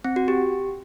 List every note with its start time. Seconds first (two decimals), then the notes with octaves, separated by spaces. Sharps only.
0.04 C4
0.16 F#4
0.28 G4